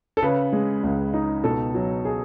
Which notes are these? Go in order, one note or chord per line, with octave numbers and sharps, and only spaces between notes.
A4
C#3 B4
G#3
C#2
D#4
B2 A4
F#3
G#4